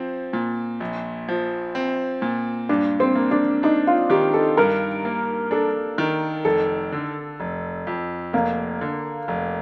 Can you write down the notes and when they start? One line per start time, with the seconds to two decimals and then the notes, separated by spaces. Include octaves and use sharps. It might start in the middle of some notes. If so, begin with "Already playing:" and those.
Already playing: F3 C4
0.33 A#2
0.80 A#1
1.29 F3
1.75 C4
2.22 A#2
2.69 G2 D4
3.00 C4
3.16 A#3
3.31 D4
3.63 D4 D#4
3.87 F4
4.10 D#3 G4
4.34 A4
4.57 G2 A#4
5.05 A#3
5.51 D4 A4
5.98 D#3
6.45 F1 A4
6.92 D3
7.40 F1
7.87 F2
8.33 F1 A#3
8.81 D3
9.28 F1